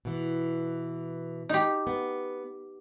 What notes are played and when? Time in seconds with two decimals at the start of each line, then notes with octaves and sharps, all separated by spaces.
0.05 B2 E3
1.49 D#4 G4
1.87 B3